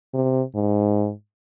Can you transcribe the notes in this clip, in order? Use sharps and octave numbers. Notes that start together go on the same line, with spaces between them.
C3
G#2